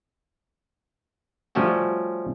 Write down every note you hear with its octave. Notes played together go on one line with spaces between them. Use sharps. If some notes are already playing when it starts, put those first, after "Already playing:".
F3 G3 A3 C#4 F#4 G4